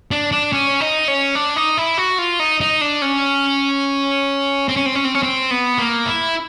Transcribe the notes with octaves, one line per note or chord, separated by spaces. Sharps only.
D4
D4
C#4
D#4
C#4
D4
D#4
E4
F#4
F4
D#4
D#4
D4
C#4
C4
C#4
C4
C#4
C4
C#4
C4
B3
A#3
E4